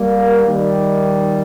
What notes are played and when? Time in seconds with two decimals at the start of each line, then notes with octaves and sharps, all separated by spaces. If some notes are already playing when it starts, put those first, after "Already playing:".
Already playing: G3 A#3
0.46 D#3 G3